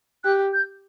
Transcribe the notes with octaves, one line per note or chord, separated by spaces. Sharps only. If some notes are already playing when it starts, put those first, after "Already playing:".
G4 F#6
G6